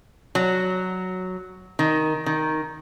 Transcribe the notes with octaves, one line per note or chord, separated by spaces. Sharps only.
F#3
D#3
D#3